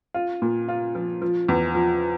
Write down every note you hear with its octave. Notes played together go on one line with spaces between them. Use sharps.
F4
A#2
F4
F3
F3
E2
F3